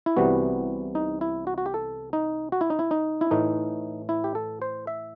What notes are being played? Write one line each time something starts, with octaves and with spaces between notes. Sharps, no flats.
E4
C2 C3 E3 G3 B3 F#4
D#4
E4
F#4
F#4
G4
A4
D#4
F#4
E4
D#4
E4
D#4
E4
A2 E3 A3 D#4
E4
G4
A4
C5
E5